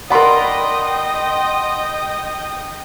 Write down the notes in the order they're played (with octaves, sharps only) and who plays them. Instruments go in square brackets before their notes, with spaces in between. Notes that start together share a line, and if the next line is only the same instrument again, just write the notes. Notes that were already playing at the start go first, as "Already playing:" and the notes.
[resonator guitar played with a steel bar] A#4 D5 [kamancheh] D#5 G5 [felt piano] F#5 B5 C6